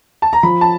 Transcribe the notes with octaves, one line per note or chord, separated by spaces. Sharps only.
A5
A#5
F3 B5
A5